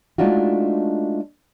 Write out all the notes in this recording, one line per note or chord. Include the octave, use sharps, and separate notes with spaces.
G#3 A3 D4 D#4 F4 F#4